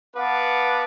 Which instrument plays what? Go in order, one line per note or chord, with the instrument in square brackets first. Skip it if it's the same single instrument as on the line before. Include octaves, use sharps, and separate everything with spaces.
[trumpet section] B3 B4 F5 F#5 A5 D6